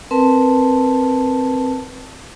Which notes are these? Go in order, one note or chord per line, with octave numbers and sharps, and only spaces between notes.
C4 A#4 B4 A5